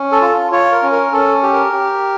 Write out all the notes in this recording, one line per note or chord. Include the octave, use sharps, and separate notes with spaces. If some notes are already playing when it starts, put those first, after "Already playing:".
Already playing: C#4
A4
F4
F4 C#5
A#4
C#4
A#4
C#4 A4
G4
A#4
G4